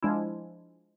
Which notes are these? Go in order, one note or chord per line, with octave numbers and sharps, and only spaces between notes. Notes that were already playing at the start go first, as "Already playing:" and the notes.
F3 G#3 D4 E4